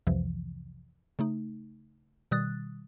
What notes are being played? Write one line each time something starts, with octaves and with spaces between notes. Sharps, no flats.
C2 F2 C3 E3 F3
C#3 A3 D#4
B2 D#3 G3 D#6 F#6 A6